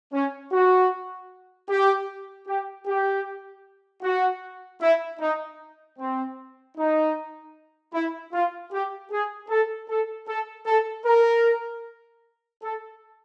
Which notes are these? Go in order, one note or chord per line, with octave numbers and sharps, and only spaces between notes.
C#4
F#4
G4
G4
G4
F#4
E4
D#4
C4
D#4
E4
F4
G4
G#4
A4
A4
A4
A4
A#4
A4